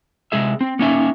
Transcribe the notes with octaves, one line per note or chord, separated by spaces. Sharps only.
C3 G#3 G#4 E5
C4
A#3 C#4 D#4 E5 G#5